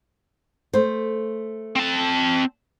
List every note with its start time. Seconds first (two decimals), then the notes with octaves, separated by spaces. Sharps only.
0.73 A3 C5
1.76 C4 A5